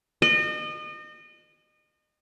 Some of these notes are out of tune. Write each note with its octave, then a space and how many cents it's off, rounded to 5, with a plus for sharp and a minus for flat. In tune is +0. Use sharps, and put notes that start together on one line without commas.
D#5 -35